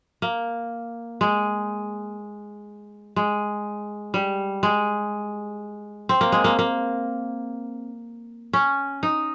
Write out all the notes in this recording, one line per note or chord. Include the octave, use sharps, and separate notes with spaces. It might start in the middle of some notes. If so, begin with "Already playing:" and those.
A#3
G#3
G#3
G3
G#3
C4
A#3
G#3
A#3
A#3
C#4
D#4